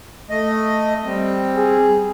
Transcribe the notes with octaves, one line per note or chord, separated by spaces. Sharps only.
A3 D#5
G3 C4
G#4